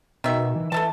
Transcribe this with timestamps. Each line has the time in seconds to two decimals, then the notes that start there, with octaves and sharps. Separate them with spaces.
0.24 B2 D#3 E5
0.56 E3
0.72 E3 A4 E5 A5